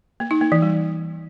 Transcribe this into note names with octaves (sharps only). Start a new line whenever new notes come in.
A#3
D#4
A#3
E3
G3